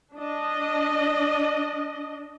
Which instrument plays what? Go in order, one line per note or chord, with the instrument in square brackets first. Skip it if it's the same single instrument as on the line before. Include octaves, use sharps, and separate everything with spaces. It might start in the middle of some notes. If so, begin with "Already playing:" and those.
[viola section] D4 D#5